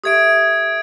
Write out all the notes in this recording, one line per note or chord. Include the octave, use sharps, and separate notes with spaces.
G4 A4 E5 D#6 G#6 D7